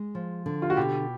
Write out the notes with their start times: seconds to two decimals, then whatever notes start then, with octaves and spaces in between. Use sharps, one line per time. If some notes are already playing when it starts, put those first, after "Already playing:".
Already playing: G#3
0.15 F3
0.46 D3
0.62 F4
0.70 F#4
0.77 B2 G4